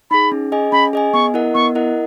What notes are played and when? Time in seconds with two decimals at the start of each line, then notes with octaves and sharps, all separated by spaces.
0.11 D#4 G#4 B5
0.32 C#4
0.52 G#4 D#5 G#5
0.72 C#4 B5
0.93 G#4 D#5 G#5
1.13 B3 C#6
1.34 E4 A#4 D#5 F#5
1.54 B3 C#6
1.75 E4 A#4 D#5 F#5